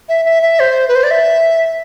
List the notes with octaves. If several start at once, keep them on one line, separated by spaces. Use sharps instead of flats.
E5
E5
E5
C5
B4
C5
D5
E5